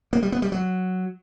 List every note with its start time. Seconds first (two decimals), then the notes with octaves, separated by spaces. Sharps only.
0.13 A#3
0.23 G3
0.32 B3
0.42 G3
0.52 F#3